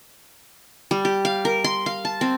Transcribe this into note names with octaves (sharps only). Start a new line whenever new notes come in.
G3
G4
F5
A#4
C6
F5
A5
C4